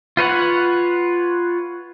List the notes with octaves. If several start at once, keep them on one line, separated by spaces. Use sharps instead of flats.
F4 B4 C#5 F#5